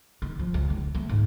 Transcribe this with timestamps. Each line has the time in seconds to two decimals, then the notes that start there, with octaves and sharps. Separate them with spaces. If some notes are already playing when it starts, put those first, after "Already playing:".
0.22 D#3
0.39 F3
0.54 C#2
0.70 D#3
0.95 A3
1.09 G#2